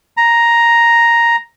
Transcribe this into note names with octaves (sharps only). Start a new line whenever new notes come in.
A#5